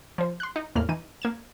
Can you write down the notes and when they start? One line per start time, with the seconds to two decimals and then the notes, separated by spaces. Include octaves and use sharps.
0.18 F3 C5
0.40 C6 F#6
0.56 D#4
0.76 E2 A2 A#3 F6
0.89 E3 D#4 D#7
1.22 A#3 G#6 E7